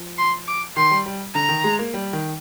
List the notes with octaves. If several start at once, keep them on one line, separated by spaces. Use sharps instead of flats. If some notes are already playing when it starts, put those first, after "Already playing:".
Already playing: F3
C6
D6
D#3 C6
G3
G3
D3 A#5
D#3
G#3
A#3
G3
D#3